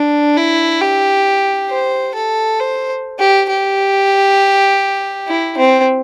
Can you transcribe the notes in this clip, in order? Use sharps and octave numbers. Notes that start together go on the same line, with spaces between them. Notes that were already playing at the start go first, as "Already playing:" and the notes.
Already playing: D4
E4
G4
C5
A4
C5
G4
G4
E4
C4